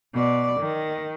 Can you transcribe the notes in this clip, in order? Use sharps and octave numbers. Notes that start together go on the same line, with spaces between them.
B2 D5
D#3